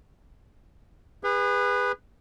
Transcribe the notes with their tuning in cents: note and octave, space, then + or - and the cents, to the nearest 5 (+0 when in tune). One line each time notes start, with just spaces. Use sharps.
G#4 -35 B4 +0